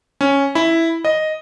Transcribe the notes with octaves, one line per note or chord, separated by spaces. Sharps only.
C#4
E4
D#5